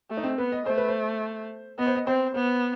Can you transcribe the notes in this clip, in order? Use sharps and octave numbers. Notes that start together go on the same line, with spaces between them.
A3
D#4
C4
B3 B4
D#5
A3 C5
B4
C5
B3 D#5
C5
D#5
C4 C5
B3 C5